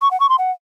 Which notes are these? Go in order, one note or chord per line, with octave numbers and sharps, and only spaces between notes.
C#6
F#5
C#6
C6
F#5